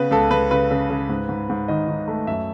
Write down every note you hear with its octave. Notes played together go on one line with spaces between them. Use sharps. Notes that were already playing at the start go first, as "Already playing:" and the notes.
Already playing: C#3 B3 B4
C#2 A4
C#2 B4
C#3 B4
C#3
C#3
G#2
G#2
G#2
D#3 D#5
D#3
A3
F#2 E5